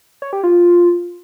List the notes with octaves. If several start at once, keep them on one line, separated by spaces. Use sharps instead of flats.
C#5
G4
F4